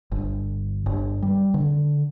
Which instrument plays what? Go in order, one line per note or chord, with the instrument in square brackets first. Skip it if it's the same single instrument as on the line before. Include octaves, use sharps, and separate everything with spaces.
[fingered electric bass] G1
G1
G3
D3